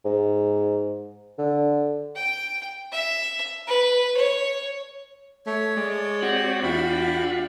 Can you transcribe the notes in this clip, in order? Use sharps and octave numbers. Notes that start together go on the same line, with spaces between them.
G#2
D3
G5
E5
B4
C#5
A3 C#5
G#3 D5
C4 F#4 G4 D5
E2 D4 F4 E5 G5 B5